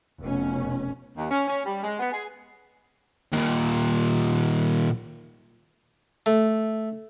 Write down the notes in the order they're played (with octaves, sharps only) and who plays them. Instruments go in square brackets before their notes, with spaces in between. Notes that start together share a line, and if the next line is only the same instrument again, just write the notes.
[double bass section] F1 B2 C#4
[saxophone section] D#2
C#4
C#4
G3
G#3
B3
G#4
[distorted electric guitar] D#2 A#2
[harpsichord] A3